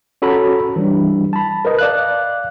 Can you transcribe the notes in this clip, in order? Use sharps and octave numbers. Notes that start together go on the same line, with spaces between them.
C#4 F#4 A4 C#5 A#5 B5
E3 G3 D4
A5 B5
A#4 B4 D#5
D5 F5 F#6